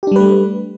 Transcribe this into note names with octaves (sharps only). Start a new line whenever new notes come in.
G3 A3 D4 G4 B4